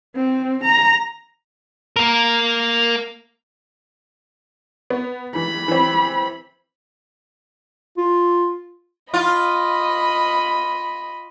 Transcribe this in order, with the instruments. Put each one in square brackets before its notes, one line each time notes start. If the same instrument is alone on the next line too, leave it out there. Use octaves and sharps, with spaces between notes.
[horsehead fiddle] C4
A#5
[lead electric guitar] A#3 A#4
[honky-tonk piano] B3
[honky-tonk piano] E3 [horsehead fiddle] B5
[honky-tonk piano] E3 C4
[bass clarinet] F4
[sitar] F4 [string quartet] D#5 B5